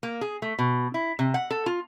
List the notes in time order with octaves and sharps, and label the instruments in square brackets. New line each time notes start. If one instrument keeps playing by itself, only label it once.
[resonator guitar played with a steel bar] A#3
G#4
A3
B2
E4
C3
F#5
A4
F4